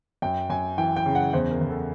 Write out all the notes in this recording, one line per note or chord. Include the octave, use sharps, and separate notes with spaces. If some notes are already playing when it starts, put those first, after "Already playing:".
F#2 G5
F#2 G#5
E3 G5
G5
C#3
F#5
E2 C5
A#4
E2
A4